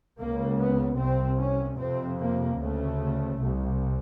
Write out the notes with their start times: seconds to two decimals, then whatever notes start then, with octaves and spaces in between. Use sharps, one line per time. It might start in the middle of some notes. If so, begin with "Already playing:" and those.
0.17 C#2 C#3 A#3
0.58 B3
0.98 C2 C3 C4
1.39 C#4
1.78 F2 C3 C4
2.18 A#3
2.59 D2 C#3 A3
3.39 C2 C3